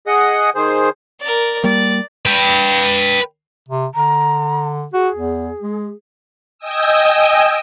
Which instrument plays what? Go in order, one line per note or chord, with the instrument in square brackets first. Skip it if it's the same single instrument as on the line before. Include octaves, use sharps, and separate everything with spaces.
[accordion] G#4 D#5 F#5 D#6
D#3 G#4 C5
[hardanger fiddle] A#4 D5
[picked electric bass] G3 A#3 [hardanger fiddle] D5
[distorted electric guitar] B4 G5
[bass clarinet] C3
[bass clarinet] D3 [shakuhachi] A#5
[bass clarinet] F#4 [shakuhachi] G#4
[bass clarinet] E2
G#3
[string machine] D#5 G5 G#5 D#6 E6